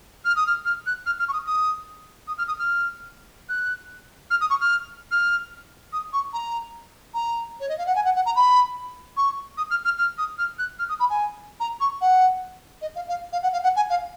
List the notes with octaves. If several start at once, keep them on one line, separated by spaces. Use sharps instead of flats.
F6
D#6
F6
F6
F#6
F6
F6
C#6
D#6
D#6
D#6
F6
D#6
F6
F#6
F6
D#6
C#6
F6
F6
D#6
C#6
A#5
A#5
C#5
D#5
F5
F#5
G#5
F#5
F#5
A#5
B5
C#6
D#6
F6
F6
F6
D#6
F6
F#6
F6
D#6
B5
G#5
A#5
C#6
F#5
D#5
F5
F5
F5
F#5
F5
F#5
G#5
F5